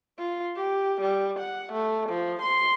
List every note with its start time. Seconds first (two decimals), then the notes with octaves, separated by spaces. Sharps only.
0.19 F4
0.56 G4
1.01 G3
1.39 F#5
1.73 A3
2.09 F3
2.42 C6